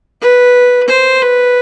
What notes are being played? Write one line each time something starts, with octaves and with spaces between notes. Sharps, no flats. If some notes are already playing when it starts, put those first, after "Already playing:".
B4
C5
B4